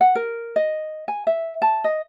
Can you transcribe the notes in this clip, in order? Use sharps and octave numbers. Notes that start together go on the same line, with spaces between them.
F#5
A#4
D#5
G#5
E5
A5
D#5